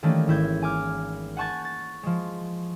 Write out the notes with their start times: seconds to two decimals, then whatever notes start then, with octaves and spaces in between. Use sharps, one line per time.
0.03 D#3 E3 G3 A3 A#3 C#4
0.27 G#1 E4 G6 G#6
0.62 G#5 D6 F6
1.37 F#5 G#5 A5 C#6 G6 A6
1.65 A6
2.03 F3 G#3